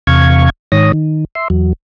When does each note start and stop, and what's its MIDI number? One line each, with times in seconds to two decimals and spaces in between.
0.07 0.50 40
0.07 0.50 48
0.07 0.50 77
0.07 0.50 85
0.07 0.50 92
0.72 0.92 44
0.72 0.92 51
0.72 0.92 73
0.72 0.92 87
0.72 0.92 94
0.93 1.25 51
1.35 1.48 76
1.35 1.48 84
1.50 1.73 40
1.50 1.73 54